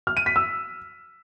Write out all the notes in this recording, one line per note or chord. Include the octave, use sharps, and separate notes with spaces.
F6
D#7
B6
E6